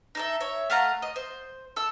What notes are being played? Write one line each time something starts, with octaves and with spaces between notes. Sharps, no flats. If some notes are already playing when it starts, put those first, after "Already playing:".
D#4 A4 E5
C#5 E5
A3 F5 F#5 A#5
D#5
C5
A4 E6